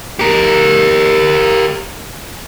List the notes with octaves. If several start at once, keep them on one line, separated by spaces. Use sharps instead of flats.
G4 A#4